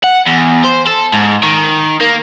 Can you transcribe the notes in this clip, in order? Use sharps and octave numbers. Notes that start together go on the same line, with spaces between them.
F#5
E2
C5
A4
G#2
D#3
A#3